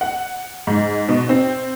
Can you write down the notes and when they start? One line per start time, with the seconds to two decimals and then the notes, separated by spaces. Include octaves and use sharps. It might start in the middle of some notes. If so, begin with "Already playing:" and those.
0.01 F#5
0.67 G#2
1.09 B2
1.29 C4